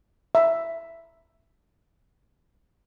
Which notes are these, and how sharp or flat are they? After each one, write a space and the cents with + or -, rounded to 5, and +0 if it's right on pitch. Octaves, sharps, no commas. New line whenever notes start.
E5 +10